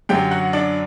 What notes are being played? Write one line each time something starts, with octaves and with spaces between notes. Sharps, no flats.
F#2 D3 F#3 G4 G5
F#4 F#5
D4 D5